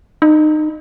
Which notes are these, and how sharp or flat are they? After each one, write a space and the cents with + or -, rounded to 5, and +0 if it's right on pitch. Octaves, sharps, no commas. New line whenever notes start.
D#4 -25